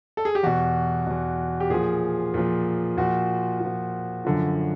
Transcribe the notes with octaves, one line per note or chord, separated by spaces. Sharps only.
A4
G#4
G4
E2 B2 F#4
E2 B2
G4
A#2 F3 G#4
A#2 F3
A#2 F3 F#4
A#2 F3
F#2 D3 F3